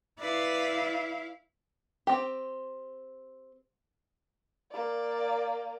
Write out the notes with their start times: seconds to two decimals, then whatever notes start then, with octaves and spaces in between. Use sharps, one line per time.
0.20 E4 B4 D5 F5
2.07 C4 G4
4.72 A#3 D5